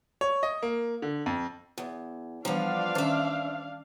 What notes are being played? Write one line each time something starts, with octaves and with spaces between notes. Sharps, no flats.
C#5
D#5
A#3
D3
F2
E2
E3 F3 G3 B3 D4 F5 A#5
D#3 C#4 C5 E5 A5